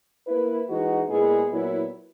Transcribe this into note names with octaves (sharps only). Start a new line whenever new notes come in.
A#3 E4 B4
E3 G#3 D#4 F#4
A#2 G#3 B3 E4 G#4
A#2 F#3 B3 E4